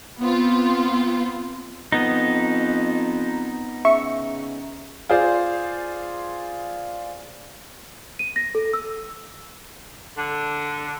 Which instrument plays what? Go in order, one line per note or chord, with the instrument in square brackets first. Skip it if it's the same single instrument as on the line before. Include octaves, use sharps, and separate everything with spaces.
[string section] B3 C4 F4
[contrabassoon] F2 [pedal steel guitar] B3 D#4
[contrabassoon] C#3 [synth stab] E5 C#6
[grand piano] F4 G#4 C5 D5
[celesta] D#7
A#6
A4
E6
[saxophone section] D3